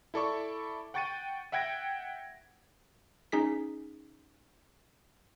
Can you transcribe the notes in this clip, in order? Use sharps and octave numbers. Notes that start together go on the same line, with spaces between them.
E4 A4 D5 C#6
F#5 G5 C#6 A6 C#7 D#7
E5 F#5 G5 G#6 A#6 D7
C#4 D#4 G#4 B6